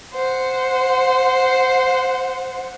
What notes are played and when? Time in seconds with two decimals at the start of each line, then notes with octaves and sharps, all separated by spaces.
0.14 C5 F#5